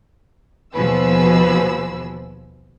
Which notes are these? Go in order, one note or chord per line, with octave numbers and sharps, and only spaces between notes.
D#2 B2 F3 G#4 B4 E6